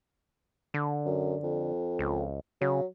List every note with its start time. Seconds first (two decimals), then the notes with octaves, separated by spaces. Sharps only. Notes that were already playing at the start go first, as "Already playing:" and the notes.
0.74 D3
1.05 F#2
1.43 F2
1.99 C#2
2.61 C#3 F#3